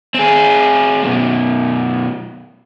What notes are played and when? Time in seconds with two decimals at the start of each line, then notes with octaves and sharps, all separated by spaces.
0.14 C4 G#4
1.03 F#2 B2